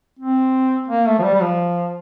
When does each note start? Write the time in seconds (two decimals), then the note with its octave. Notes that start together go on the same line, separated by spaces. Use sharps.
0.19 C4
0.88 A#3
1.06 A3
1.19 F3
1.23 G3
1.34 G3
1.41 F3